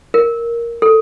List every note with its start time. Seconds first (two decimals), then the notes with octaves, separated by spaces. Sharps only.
0.14 A#4
0.82 A4